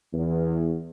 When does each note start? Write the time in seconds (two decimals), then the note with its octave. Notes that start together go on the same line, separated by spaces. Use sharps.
0.14 E2